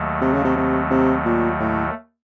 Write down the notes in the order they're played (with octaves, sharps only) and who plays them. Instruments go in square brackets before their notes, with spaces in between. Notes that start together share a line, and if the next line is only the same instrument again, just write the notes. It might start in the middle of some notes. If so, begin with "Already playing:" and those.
Already playing: [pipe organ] D#2 D#3 F#3 A3
[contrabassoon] C3
C#3
C3
C3
C3
A#2
A2